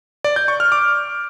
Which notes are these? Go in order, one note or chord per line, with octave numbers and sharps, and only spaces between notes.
D5
G6
C#6
F6
D6